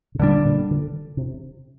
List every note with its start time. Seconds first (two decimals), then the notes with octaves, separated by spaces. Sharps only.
0.15 C3
0.19 A#2 D3 G3 D4
0.45 A#2
0.71 D3
1.17 C3